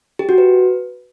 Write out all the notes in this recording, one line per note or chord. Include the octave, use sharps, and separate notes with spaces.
G4
F#4
B4